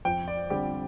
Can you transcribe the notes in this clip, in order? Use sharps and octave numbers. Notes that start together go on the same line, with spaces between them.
F2 G5
D5
D3 G3 C4 G4